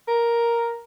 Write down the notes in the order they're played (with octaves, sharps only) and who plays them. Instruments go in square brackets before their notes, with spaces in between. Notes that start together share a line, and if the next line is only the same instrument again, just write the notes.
[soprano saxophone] A#4